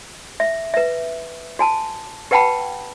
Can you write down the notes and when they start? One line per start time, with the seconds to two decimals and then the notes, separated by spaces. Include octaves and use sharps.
0.40 E5
0.74 B4 E5
1.59 F#4 G#5 A5
2.31 G4 B4 F#5 G5 A5 B5